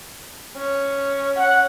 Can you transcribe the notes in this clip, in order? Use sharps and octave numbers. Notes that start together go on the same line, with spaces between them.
C#4
F#5